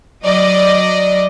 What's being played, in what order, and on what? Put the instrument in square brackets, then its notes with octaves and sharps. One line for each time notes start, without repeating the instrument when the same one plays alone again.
[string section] F#3 D5 D#5